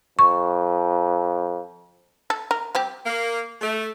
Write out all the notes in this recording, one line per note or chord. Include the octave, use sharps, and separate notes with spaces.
F2 C#6
A4
A#4
G3 C4 G4
A#3
A3